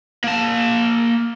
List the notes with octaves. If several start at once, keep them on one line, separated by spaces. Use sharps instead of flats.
A#3 A5